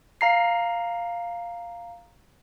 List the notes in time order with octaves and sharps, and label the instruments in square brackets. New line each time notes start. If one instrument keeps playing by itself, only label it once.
[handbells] F5 A#5 C7